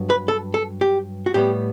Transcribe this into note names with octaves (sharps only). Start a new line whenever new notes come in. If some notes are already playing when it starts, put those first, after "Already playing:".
Already playing: G2 F#3 B3
B4
A4
A4
G4
F#4
A2 G3 B3 G4